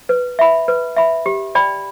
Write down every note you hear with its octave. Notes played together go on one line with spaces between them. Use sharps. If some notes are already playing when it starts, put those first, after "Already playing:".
B4
E5 B5
B4
E5 B5
G4
D5 G5 B5